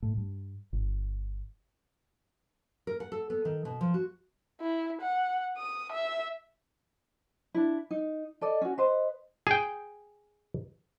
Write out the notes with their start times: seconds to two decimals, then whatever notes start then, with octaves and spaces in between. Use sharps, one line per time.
0.03 A2
0.17 G2
0.73 G1
2.87 A#4
3.00 F#5
3.12 A4
3.30 B3
3.45 D#3
3.65 B2
3.81 F3
3.94 F#4
4.61 E4
5.02 F#5
5.58 D#6
5.93 E5
7.54 D4 E4
7.91 D#4
8.41 A4 D5 D#5
8.61 C#4 F#4
8.78 B4 C5 D#5
9.47 G#4 G5